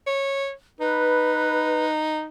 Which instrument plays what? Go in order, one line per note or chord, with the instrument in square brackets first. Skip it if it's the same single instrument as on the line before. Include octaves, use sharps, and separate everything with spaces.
[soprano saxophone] C#5
[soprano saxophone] D#4 [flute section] B4